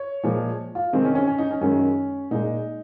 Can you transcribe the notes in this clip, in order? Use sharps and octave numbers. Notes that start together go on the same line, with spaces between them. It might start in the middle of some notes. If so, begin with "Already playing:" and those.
Already playing: C#5
A#2 F3 G#3
F4
C3 D#3 G#3 C4
C#4
C#4
C#4
D#4
C#4
F#2 D#3 G#3 C#4
A#2 G#3 D#4